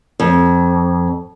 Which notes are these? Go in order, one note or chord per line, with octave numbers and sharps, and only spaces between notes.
F2